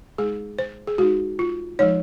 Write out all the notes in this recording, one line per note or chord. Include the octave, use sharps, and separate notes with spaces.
G#3 D#4 G#4
C5
G#4
G#3 D#4 F#4
F4
F3 G#3 D#4 C#5